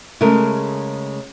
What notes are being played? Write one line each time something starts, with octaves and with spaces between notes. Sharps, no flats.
C#3 G#3 A3 A#4